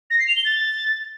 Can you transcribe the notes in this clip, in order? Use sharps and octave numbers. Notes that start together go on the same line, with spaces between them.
A#6
C7
F7
G7
A6